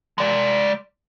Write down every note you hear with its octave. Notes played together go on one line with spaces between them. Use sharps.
G#3 D5